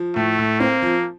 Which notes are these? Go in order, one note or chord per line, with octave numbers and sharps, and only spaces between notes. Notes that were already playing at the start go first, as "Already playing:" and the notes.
Already playing: F3
A2 A3
A2
A#3 C4
F3